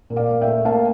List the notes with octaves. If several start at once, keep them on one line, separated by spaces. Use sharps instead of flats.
A#2
D5 F5
A#2
E5 G5
A3
A#3 F5 A5